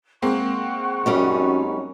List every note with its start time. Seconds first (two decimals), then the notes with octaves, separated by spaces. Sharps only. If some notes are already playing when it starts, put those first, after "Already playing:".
0.22 G#3 A#3 C4 F#5 C#6
1.06 F#2 G3 C#4 D#4